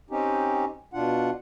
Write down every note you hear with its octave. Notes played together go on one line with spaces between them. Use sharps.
C4 C#4 D#4 G4
B2 D4 F4 F#5